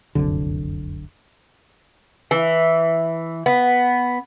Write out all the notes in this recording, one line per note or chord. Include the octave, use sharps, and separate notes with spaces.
F1 C2 F#2 D3
E3
B3